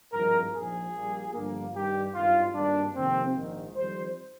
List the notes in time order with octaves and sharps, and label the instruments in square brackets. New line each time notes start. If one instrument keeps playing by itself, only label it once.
[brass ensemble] G#1 G2 F3 G#3 A#4
A#1 G#2 F3 G#4
A#1 A#2 G3 A#3
G1 G2 D3 F3 A#3
G2 D#3 G3 G4
G#1 G2 D#3 G3 F4
G#1 G2 D#3 A#3 D4
F2 C3 D#3 A#3 C4
A#1 G#2 D#3
F2 D#3 G3 C5